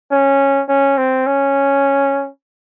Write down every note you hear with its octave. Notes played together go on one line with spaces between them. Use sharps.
C#4
C#4
C4
C#4